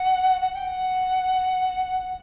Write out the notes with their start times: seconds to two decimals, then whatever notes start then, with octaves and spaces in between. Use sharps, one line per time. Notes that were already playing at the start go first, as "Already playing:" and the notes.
Already playing: F#5
0.41 F#5
0.54 G5
0.66 F#5